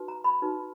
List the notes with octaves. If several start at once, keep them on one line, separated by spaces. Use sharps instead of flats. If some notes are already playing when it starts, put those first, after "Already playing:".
Already playing: D#4 F#4 B4
A#5
B5
D#4 F#4 B4